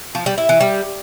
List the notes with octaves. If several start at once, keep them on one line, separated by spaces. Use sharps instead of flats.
F3
G3
E4
E3
G3